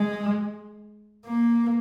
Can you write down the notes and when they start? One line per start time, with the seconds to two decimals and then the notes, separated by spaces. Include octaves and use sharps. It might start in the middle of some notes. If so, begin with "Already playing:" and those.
Already playing: G#3
1.26 A#3